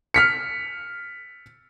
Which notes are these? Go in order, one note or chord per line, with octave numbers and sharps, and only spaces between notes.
F6 B6 C#7